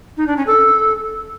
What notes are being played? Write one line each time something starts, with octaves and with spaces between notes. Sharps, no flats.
D#4
D4
C#4
A4